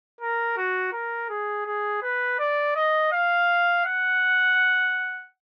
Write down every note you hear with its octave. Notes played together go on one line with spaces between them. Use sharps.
A#4
F#4
A#4
G#4
G#4
B4
D5
D#5
F5
F#5